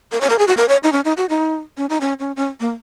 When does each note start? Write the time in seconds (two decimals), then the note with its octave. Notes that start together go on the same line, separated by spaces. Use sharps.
0.12 A#4
0.21 C#5
0.30 A#4
0.39 G#4
0.48 F#4
0.57 A#4
0.69 C#5
0.83 D#4
0.92 C#4
1.05 D#4
1.17 F#4
1.29 D#4
1.77 C#4
1.89 D#4
2.01 C#4
2.19 C#4
2.36 C#4
2.60 A#3